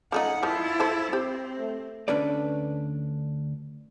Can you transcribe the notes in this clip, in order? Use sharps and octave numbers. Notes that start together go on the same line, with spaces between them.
F3 A3 C#4 D#4 F#5
D#3 F3 E4 F4
A4 C5
C4 G4 C5
A3
D2 C#4 D4 A4 B4 D5